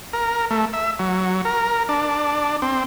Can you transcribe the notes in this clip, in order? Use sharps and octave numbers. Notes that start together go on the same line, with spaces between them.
A#4
A3
E5
F#3
A#4
D4
C4